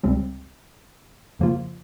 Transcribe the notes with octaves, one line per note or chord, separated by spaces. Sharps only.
C#2 C3 G3 C4
F2 C#3 F3 A#3 F4